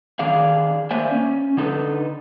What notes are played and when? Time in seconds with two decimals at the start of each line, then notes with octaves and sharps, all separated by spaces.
0.19 D#3 G#4 D5 F5
0.91 A#3 C5 D5 E5 G#5
1.11 C#4
1.57 D3 D#4 A4 B4